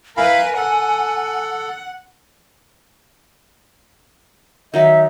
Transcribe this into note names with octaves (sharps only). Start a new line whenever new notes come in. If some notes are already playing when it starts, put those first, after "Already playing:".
E4 A#4 B4 F5 G#5 B5
A4 F#5
D#3 F#3 D#4 E5